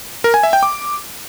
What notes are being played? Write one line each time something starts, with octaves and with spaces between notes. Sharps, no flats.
A#4
G#5
E5
G5
D6